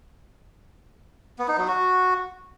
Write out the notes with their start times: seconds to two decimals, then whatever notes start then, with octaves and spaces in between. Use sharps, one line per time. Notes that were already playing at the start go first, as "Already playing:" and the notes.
1.39 B3
1.48 D#4
1.58 F#3
1.68 F#4